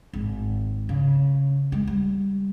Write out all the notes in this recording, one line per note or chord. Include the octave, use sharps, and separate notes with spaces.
G#1
C#3
G#3
G3